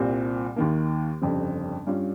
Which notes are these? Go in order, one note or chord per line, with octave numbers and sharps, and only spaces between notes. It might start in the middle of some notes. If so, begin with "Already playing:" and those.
Already playing: C2 A#2 G3 C4
D#2 D#3 A#3
G1 F2 C#3 G3 C4
G2 G3 C#4 F4